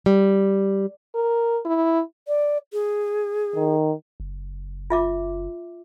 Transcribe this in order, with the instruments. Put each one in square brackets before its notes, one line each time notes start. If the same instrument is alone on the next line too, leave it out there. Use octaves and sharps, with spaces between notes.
[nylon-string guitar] G3
[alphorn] A#4
E4
[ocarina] D5
G#4
[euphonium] D#3
[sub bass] F#1
[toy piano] F4 E5 D6